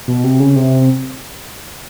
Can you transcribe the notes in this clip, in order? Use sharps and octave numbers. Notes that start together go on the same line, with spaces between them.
B2
C3
C#3
C3